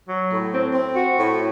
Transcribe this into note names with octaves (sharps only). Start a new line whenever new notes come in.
F#3
A2
C4
C4
F#4
A2